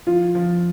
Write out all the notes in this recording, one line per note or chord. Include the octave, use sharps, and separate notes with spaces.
F3 F4
F3 F4